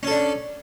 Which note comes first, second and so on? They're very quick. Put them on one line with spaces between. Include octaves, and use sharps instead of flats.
C#4 A4 D4